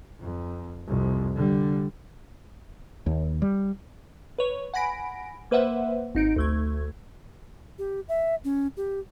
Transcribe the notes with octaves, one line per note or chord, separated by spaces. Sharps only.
F2
C2 F2
D3 G3
D#2
G3
B4 C#5
F#5 G#5 B5 A#6 D7
A#3 B4 C5 E5 F#5
G#1 D#4 D7
D2 A3 G#6
G4
E5
C#4
G4